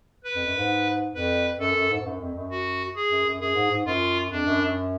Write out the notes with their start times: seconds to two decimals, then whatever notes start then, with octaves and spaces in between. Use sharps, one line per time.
0.24 B4
0.35 F2
0.47 F#2
0.58 G#2
1.14 F2 B4
1.60 F#2 A4
1.75 F#2
1.90 G#2
2.00 G#2
2.05 F#2
2.20 F2
2.35 F#2
2.50 F#4
2.96 G#4
3.11 F#2
3.26 F#2
3.41 F#2 G#4
3.55 G#2
3.71 G#2
3.86 F#2 F4
4.31 F2 D4
4.46 F#2
4.62 F#2